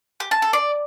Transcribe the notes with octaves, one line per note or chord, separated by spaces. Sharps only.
G4
A5
A4
D5